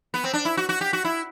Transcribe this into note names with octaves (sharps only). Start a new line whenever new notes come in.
B3
C4
D4
E4
F#4
F#4
G4
F#4
E4